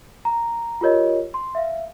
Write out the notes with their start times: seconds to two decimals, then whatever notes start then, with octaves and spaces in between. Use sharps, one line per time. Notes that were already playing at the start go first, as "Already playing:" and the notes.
0.25 A#5
0.81 F4 G4 A#4 C#5 D#5
1.34 C6
1.55 E5 F5